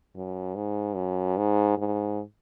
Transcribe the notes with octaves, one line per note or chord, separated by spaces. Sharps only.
F#2
G#2
F#2
G#2
G#2